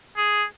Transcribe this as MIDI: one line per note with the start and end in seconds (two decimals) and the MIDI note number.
0.17 0.44 68